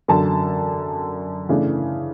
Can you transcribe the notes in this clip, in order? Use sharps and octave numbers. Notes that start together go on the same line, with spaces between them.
F#2 D3 F#3 A5
C#3 E3 A3 D4